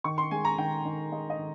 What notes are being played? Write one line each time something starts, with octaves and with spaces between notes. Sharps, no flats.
D#3 C#6
C6
G#3 G#5
A#5
D#3 G5
D#3
G#3 D#5
D#5
D#3